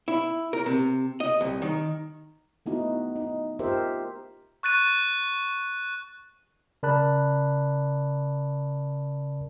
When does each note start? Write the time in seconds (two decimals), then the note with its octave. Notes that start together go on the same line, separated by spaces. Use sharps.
0.08 E4
0.53 A#4
0.66 C3
1.20 D#5
1.41 C2
1.62 D#3
2.66 A3 B3 D#4 E4 F#4
3.16 D#4
3.59 F4 G4 A#4 C5 E5
4.63 C#6 F#6 A6 D#7
6.83 C#3 A#4 D5 A5 B5 F#6